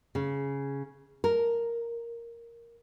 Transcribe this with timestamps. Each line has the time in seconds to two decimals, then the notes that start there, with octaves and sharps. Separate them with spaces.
0.15 C#3
1.24 A#4